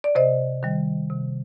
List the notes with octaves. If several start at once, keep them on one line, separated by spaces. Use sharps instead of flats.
D5
C3 C5 D#5
D#3 G3
C3